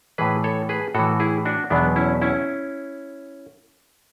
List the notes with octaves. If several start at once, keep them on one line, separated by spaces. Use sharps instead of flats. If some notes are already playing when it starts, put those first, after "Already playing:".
A2 E3 G#4 B4
A4 C#5
G#4 B4
A2 E3 F#4 A4
E4 G#4
D4 F#4
E2 B2 F#3 B3 D4
C#4 E4
C#4 E4